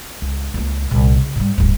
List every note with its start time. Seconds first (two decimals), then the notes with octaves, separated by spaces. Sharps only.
0.22 C#2
0.54 C#2 A#3
0.91 C2 A#2
1.18 C#3
1.36 G#2 G3
1.58 D1 G2